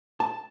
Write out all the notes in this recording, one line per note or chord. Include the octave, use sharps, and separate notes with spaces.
A5